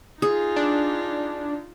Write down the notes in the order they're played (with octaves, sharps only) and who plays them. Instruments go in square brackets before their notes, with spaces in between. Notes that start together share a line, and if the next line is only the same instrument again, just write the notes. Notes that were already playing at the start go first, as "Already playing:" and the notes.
[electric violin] D#4 F4 [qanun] G#4
[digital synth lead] D4